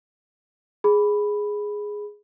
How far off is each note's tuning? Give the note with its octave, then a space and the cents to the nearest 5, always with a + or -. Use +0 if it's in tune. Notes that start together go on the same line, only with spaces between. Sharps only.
G#4 +0 B5 +0